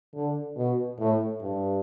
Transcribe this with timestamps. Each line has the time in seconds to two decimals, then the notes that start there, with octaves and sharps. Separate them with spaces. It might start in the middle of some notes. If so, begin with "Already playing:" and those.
0.14 D3
0.56 B2
0.98 A2
1.41 G2